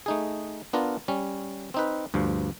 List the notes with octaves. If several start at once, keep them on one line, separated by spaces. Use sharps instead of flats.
A3 D#4 G#4
B3 D4 F4 A#4
G3 C#4
C4 D#4 B4
D2 G2 F3